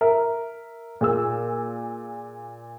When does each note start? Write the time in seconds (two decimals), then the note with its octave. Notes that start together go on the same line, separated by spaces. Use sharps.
0.01 A#4 E5
1.01 A#2 G#4 E6